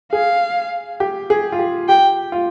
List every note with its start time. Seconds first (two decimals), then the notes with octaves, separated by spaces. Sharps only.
0.12 G#4 F5
1.00 G4
1.30 G#4
1.52 F4
1.59 G4
1.89 G4 G5
2.32 F4